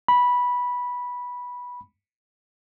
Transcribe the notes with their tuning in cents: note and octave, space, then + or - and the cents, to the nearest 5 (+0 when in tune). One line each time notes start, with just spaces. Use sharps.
B5 -10